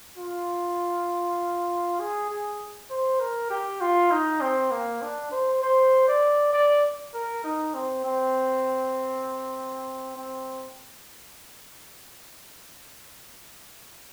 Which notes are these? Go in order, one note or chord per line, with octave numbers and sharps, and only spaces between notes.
F4
G#4
G#4
C5
A#4
G4
F4
D#4
C4
A#3
D4
C5
C5
D5
D5
A#4
D#4
C4
C4
C4